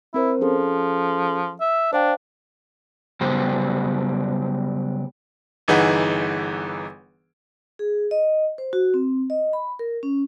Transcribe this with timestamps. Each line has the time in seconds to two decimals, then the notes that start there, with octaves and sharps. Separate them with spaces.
0.14 C4 E4 A#4 C5
0.41 F3 C#4 G#4 A4
1.61 E5
1.93 D4 C5 F5 G5
3.21 C#3 F#3 G3 B3 G4 C5
5.68 G1 E3 D#4 G#4 B4 F#5
7.79 G#4
8.11 D#5
8.58 C5
8.73 F#4
8.94 C4
9.30 D#5
9.53 B5
9.79 A#4
10.03 C#4